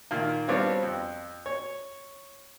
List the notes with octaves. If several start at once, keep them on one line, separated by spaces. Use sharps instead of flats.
A#2 D#3 A#3
G3 B3 C4 D4 F4 C#5
F2
C#5